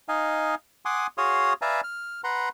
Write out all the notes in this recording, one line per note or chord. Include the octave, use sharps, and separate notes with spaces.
D#4 D#5 F5 G#5
F#5 G#5 C6 D6 D#6
F#4 G#4 C#5 F5 C6 D#6
B4 D5 E5 F5 G#5 A#5
F6
B4 F#5 A#5 C6